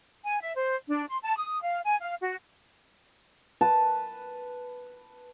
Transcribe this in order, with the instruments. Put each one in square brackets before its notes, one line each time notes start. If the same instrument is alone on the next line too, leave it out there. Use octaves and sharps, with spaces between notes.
[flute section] G#5
E5
C5
D4
C6
A5
D#6
F5
G#5
F5
F#4
[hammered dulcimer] B4 A5